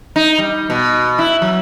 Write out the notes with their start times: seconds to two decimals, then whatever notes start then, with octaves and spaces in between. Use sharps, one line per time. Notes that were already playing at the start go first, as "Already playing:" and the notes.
0.16 D#4
0.39 G3
0.70 B2
1.19 E4
1.42 F#3